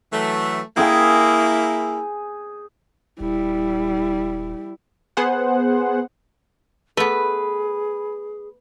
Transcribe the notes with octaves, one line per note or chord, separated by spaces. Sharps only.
E3 F#3 A3
A#3 E4 G#4 G5 G#5
D#1 G3 E4
B3 G#4 C5 F#5
A3 B3 G#4 B4